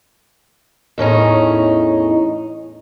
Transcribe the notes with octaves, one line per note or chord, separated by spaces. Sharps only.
E2 A2 C#4 D#4